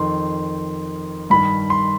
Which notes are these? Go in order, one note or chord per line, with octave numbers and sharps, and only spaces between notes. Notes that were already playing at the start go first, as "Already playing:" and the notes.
Already playing: F2 D#3 C6
G2 D#3 B5
C6